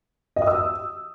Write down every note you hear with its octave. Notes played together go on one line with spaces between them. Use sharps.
D#5
D#6
E6